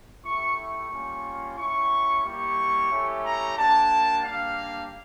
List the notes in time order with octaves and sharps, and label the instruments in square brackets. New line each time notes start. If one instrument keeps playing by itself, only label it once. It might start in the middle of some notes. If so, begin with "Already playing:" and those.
[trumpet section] A3 E4 G4 C#6
C#6
G3 A#3 C#4 F4
C#4 E4 G4 C#6
G3 A#3 E4 G4 C#6
A3 C#4 E4 G4
A#5
A#3 D4 G4 A5
G3 A#3 D4 F5